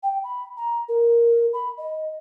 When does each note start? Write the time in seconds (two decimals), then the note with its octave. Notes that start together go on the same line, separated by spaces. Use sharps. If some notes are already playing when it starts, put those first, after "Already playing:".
0.03 G5
0.24 B5
0.57 A#5
0.89 A#4
1.53 B5
1.78 D#5